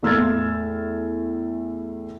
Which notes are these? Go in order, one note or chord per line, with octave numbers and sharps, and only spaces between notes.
E2 A2 E6 F6 G#6 A6